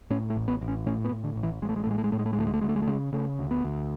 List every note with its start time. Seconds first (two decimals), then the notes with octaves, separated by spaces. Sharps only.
0.10 A2 C#4
0.30 A3
0.36 A1
0.48 B3
0.61 A1
0.68 C#4
0.87 A2 C#4
1.05 B3
1.12 A2
1.24 D3
1.36 A1
1.43 E3
1.62 A1 G#3
1.69 A3
1.76 G#3
1.84 A3
1.87 A2 G#3
1.98 A3
2.04 G#3
2.12 A2 A3
2.19 G#3
2.26 A3
2.33 G#3
2.38 D2 A3
2.47 G#3
2.54 A3
2.61 D2 G#3
2.69 A3
2.76 G#3
2.82 A3
2.87 C#3 G#3
3.13 C#3 A3
3.39 D2
3.51 B3
3.64 D2